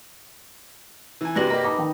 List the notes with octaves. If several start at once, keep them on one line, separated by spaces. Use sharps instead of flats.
E3 G#5
G2 C3 G3 F#4 B4 D5 A#6 F#7
A#3 G4 D#5
D#4 A5 B5 D6
D#3 G5